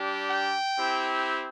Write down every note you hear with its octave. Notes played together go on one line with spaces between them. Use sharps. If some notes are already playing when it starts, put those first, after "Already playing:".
Already playing: G3 D4 G4
G5
C4 E4 G4